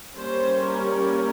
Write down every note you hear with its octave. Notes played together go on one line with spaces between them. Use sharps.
G3 A#3 C#4 C5
A#4